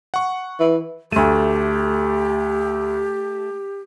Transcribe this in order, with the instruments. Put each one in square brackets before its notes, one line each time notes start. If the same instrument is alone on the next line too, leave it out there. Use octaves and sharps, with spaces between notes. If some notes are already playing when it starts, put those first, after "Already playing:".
[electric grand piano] F#5 C#6
[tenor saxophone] E3
[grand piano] D2 D#7 [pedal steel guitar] A3 [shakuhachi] G4